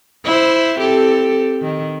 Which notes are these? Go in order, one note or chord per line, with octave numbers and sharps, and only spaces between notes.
E4 C5
C4 G4 A4
D#3